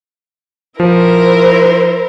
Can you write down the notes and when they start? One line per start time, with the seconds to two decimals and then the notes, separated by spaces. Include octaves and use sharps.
0.80 F3 E4 A#4 C5